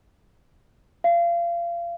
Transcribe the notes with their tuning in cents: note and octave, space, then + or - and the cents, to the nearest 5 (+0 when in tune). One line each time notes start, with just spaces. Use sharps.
F5 -30